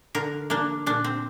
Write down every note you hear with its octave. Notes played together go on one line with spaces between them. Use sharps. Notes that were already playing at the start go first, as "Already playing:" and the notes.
D3 A#4
A#3 D4
A#2 D4
C4